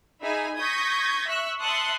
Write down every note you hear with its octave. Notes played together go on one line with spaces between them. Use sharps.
D#4 G#4 E5 G#5 B5
C#6 D#6 G6 G#6 A#6 B6
E5 C#6 E6 F#6
E5 A5 C6 D#6 F#6 C#7